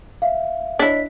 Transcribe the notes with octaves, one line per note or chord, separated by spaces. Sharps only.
E5 F5
D4 E4 C#5 D#5 B6